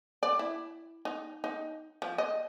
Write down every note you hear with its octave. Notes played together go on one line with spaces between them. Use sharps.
D5
E4
D#4
D#4
F3
D#5